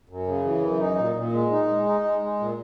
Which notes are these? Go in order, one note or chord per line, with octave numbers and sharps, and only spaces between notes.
F#2
C#3
E3
F#2
D#4
A#2
A#2
G#3
D#4
G#3
D#4
G#3
G#3
A#2